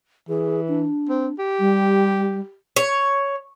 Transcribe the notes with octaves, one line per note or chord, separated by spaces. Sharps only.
E3 G#4
D4
C4
G4
G3
C#5